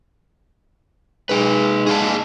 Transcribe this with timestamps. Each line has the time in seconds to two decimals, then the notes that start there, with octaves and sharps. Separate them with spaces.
1.29 G#3 D#4 B4
1.87 G#4 F5 A5